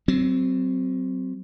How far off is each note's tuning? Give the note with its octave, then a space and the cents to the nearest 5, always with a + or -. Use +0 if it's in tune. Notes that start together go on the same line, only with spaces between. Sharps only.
F#3 +25 C4 -10